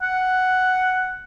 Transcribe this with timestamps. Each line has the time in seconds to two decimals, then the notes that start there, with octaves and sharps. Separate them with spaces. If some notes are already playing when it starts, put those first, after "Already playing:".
0.02 F#5